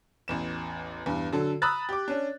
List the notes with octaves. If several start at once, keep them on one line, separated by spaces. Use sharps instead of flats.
A1 E2 E7
E2 G2
D3 F#3 A4
A#5 B5 D#6 E6 F#6 A6
G4 D6
C#4 D4